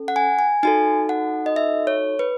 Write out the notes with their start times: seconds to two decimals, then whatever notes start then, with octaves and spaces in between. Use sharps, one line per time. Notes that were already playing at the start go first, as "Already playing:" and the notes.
Already playing: C#4 A4
0.08 F#5
0.16 G#5
0.39 G#5
0.63 D#4 F#4 A4 G#5
1.09 F#5
1.46 D#5
1.56 E5
1.87 C#5
2.19 B4